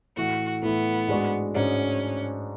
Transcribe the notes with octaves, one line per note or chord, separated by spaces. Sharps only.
A2 E3 A3 F#4
A2 E3 A3 B3
G#2 G#3 D4 F#4
G#2 G#3 C#4 D4 F#4